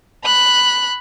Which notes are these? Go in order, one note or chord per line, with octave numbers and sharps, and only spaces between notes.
B5 F#6